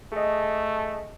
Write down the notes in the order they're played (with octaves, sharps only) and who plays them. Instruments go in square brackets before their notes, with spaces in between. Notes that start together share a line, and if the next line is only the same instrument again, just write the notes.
[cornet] A3 [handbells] G#4 D#5